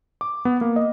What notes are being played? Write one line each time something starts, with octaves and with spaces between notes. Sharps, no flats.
D6
B3
A#3
D#5